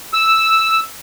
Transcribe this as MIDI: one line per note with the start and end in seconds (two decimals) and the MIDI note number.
0.14 0.80 88